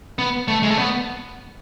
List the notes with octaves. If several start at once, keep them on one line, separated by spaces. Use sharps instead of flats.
B3
A3
G#3
A3
B3